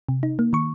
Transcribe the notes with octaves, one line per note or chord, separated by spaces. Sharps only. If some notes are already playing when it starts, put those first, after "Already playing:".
C3
D#4
A#3
D#3 C#6